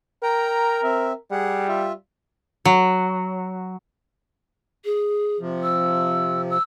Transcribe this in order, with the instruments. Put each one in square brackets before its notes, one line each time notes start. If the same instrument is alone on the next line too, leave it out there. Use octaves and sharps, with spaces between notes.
[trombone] A#4 [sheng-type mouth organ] G5 A#5
[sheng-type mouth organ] C4 E5
[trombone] G3 [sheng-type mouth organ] G#4 F#5
[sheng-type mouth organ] F4 E5
[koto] F#3
[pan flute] G#4
[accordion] C3 F3
[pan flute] E6
E6